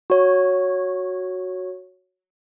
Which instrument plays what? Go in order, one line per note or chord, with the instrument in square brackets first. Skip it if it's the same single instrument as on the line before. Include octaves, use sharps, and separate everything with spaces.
[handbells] F#4 C#5